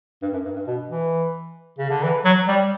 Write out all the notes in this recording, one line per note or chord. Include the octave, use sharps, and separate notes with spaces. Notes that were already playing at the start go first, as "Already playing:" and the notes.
G2
F#2
G2
G2
B2
E3
C#3
D3
E3
F#3
G3